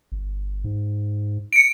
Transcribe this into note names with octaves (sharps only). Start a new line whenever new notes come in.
G1
G#2
C#7 D7